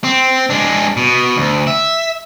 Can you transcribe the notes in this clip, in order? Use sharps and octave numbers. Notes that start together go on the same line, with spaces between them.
C4
G#3 D4
B2
D2
E5